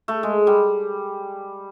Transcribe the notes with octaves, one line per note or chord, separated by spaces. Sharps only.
A3
G#3
G3